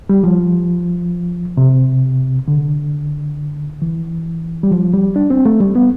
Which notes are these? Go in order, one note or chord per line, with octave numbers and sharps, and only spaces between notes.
G3
F3
C3
D3
E3
G3
F3
G3
D4
C4
A3
G3
B3